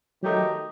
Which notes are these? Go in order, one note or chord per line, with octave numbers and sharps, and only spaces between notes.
D#3 F#3 A3 D#4 G4 D#5